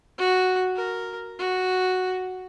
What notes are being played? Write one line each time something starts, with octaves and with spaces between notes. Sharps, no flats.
F#4
A#4
F#4